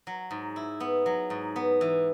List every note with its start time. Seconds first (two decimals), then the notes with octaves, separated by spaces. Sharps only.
0.07 F#3
0.31 G#2
0.56 E4
0.80 B3
1.06 F#3
1.30 G#2
1.56 B3
1.81 E3